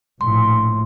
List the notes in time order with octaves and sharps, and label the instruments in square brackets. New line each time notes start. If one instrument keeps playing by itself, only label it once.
[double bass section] A#1 A2 [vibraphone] C6